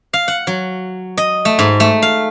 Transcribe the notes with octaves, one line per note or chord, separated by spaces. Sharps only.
F5
F#5
F#3
D#5
A3
G#2
A3
F5